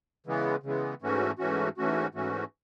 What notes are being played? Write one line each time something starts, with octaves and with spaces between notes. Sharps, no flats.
C#3 E3 G#3 B3
C#3 E3 G#3 B3
G#2 E3 A3 C#4 F#4
G#2 E3 A3 C#4 F#4
G#2 E3 A3 C#4 F#4
G#2 E3 A3 C#4 F#4